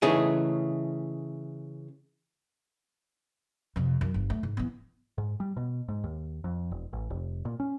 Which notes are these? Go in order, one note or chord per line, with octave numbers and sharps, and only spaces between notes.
C#3 E3 A3 D#4 G#4
F2 C3
F#2 D#3
G1
A3
G#2
E3 B3
G#2
G3
B2
G#2
D#2
F2
E1
A1
F1
A#2
C#4